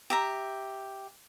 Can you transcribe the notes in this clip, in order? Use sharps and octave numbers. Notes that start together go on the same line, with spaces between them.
G4 E5 A#5